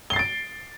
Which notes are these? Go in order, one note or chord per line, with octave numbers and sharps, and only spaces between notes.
A6 C7 D7 G7